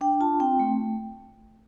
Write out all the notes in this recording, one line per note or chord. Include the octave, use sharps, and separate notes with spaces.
D4 G5
F4 A5
C4 G5
A3